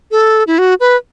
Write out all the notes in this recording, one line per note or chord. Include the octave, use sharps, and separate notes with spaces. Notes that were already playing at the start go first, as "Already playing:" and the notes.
A4
E4
F#4
B4